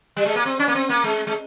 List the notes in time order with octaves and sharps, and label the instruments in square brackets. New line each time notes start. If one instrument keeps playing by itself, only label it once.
[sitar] G3
G#3
A#3
C4
C#4
A#3
C4
A#3
G#3
G#3